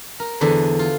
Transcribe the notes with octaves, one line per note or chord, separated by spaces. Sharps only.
A#4
E2 D3 D4 B4 C5
F4